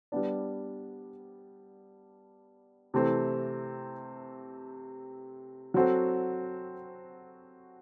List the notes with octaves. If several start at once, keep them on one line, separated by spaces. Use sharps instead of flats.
G3 B3 D4
C3 E3 A3 C4
F#3 C4 F#4 A4